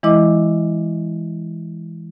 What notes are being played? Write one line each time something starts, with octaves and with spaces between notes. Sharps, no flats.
E3 G#3 E4 D#5 D6